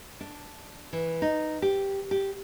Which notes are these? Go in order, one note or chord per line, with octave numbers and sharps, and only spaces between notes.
D4
E3
D#4
G4
G4